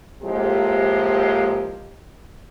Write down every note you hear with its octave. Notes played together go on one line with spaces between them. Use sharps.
A2 C3 F3 G#3 A#3 G4